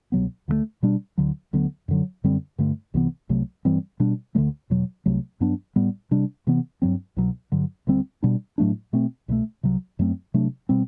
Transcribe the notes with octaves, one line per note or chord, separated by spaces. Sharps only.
C2 B2 F#3 B3
D2 D3 F#3 A3
B2 G3 D4
D2 D3 F#3
D2 D3 F#3 B3
F#2 D3 F#3
F#2 D3 G3 C4
G2 D3 A3
C2 C3 E3 B3
C2 C3 F#3 A3
G2 E3 G3 C4
B2 G3 D4
D2 D3 F#3 A3
E2 B2 F#3
C2 C3 F#3 A3
G2 F#3 B3 D4
A2 G3 B3
C3 G3 D4
C3 E3 B3
G2 F#3 C4
C2 B2 F#3
G2 D3 F#3
D2 D3 G3 C4
B2 G3 D4
A2 F#3 A3 D4
B2 A3 C4
C2 B2 F#3 A3
C2 C3 F#3
F#2 F#3 A3 C4
C3 F#3 A3 D4
B2 G3 C4